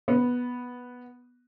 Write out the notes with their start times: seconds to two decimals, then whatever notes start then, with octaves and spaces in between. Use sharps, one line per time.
0.08 B3